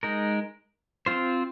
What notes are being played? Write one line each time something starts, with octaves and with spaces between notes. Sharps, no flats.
G#3 D#4 A#4
C4 F4 C5